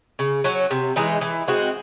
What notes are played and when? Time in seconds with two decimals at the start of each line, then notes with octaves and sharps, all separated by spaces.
0.19 C#3
0.44 F#3 C#4
0.71 C3
0.96 E3 G#3 D#4
1.21 E3
1.48 G#3 C4 F#4